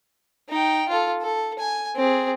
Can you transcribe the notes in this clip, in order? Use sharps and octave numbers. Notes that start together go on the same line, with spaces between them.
D#4 G5
F4 A4
A4
G#5
C4 G#4